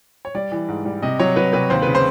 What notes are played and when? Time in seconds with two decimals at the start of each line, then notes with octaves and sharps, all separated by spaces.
0.25 C#5
0.35 G3 D5
0.52 E3
0.68 G#2
0.85 G3
1.02 C3 D#5
1.19 F#3 C#5
1.36 F#3 B4
1.53 C3 B4
1.70 D#2 C5
1.82 C#3 B4
1.95 C5